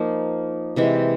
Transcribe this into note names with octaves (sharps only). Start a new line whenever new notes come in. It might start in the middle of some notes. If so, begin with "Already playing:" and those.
Already playing: F3 A#3 D#4
C3 E3 G#3